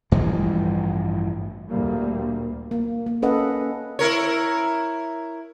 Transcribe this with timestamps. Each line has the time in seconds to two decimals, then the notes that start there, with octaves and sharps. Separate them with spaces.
0.12 A1 G2 E3 F3
1.70 D2 A#2 G3 A#3
2.71 A#3
3.06 A#3
3.22 C#4 A4 B4 D#5 F#5
3.99 E4 A#4 C#5